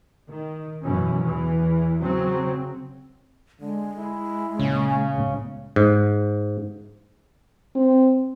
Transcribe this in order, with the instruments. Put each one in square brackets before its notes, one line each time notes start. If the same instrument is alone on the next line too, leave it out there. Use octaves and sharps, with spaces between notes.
[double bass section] D#3
F#2 B2 E3 C#4
E2 E3
C#3 F#3 C4
[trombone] D3 [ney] G#3
[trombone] E4
[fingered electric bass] C#2 A#2 [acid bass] C#3 [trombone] C#4
[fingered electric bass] C#2 A2 B3
[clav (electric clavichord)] G#2
[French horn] C4